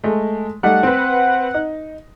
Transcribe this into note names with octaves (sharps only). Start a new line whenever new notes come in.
G#3 A3
G3 A3 D#4 F#5
C4 B4
D#4